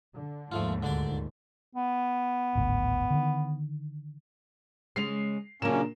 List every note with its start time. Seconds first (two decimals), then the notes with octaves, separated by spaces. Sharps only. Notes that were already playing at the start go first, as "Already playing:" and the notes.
0.15 D3
0.52 D#2 G#2 F3 A3 F4
0.83 D2 A#2 D3 D4 D5
1.75 B3
2.55 D1 G#1 D2
3.10 D3 D#3
4.96 C#3 G#3 C#4 C7 F7
5.62 F#2 A#2 C#3 A#3 C#4 D4 A#4 E7